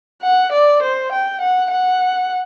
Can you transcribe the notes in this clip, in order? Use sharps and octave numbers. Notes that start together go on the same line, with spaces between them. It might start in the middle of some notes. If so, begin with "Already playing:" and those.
F#5
D5
C5
G5
F#5
F#5